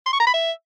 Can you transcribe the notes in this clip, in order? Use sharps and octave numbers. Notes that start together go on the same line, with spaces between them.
C6
C#6
A#5
B5
E5